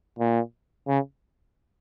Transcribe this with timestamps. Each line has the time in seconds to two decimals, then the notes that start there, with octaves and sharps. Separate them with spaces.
0.19 A#2
0.88 C#3